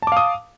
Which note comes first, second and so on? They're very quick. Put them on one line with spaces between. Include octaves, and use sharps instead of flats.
A5 D6 F5 D#6